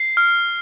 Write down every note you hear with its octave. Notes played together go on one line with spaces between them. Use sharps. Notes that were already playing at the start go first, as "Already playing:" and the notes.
Already playing: C7
F6